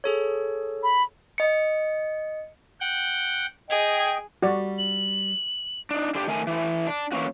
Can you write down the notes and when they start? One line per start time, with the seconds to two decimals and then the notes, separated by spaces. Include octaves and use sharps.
0.04 G#4 A4 C#5
0.83 B5
1.38 D#5 C#7
2.80 F#5 G5
3.70 G#4 D#5 G5 G#6
4.42 G3 F#4 D5
4.78 F#7
5.91 D4 D#4
6.15 D3 D4 G4
6.27 D#3 A3 A#4 G#5
6.47 E3 A3
6.87 D4
7.12 E3 F#3 A#3 C#4 F#4